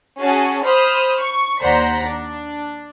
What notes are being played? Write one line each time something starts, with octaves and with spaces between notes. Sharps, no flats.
C#4 F#4 G#4 A5
C5 B5 D#6 F6
C#6
D#2 C5 D5 F#5 A#5 B6
D4